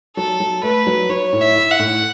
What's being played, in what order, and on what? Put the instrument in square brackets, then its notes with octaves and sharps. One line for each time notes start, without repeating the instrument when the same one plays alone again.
[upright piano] F#3 [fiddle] A4
[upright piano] F#3
[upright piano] A3 [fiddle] B4
[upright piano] F#3
[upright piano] F#3 [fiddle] C#5
[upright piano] A2
[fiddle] E5
[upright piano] E4
[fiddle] F#5
[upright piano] A2